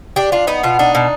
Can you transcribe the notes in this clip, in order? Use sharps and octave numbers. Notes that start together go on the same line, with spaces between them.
D4 G4
D4 F4
B3 D#4
B2 F4
D4 D#4
B2